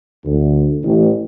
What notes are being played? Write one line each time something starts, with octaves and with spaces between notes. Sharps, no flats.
D2
A1